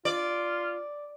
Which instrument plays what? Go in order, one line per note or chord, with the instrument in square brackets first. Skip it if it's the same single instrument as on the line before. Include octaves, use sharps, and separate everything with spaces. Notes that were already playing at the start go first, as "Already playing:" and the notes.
[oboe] F4 [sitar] D5